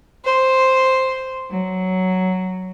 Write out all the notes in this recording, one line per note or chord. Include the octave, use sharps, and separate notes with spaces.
C5
F#3